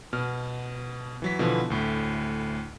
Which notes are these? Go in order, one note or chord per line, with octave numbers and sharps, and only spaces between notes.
B2 F6
E3 F#3 B6
B2 D3 E3 F3
D2 A2